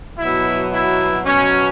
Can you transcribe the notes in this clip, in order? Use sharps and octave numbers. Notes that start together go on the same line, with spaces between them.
B2 F#3 E4
E4
B2 F#3 C#4